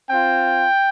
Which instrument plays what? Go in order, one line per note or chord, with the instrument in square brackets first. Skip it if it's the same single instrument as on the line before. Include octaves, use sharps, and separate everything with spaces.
[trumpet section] C4 F4 G5